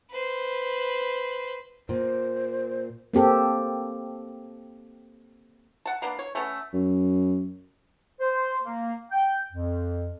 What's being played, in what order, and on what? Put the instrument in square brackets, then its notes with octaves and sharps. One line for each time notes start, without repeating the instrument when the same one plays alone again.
[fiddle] B4 C5
[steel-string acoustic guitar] A#2 [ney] C5
[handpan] A#3 C4 G4 A4
[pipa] F#5 A5
A#3 B3 D4
C#5
A3 B3 C#4 A4
[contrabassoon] F#2
[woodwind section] C5
A#3
G5
F2